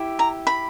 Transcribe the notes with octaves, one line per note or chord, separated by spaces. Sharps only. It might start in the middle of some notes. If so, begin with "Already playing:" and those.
Already playing: E4 G4
A#5
B5